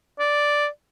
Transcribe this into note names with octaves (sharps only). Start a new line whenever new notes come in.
D5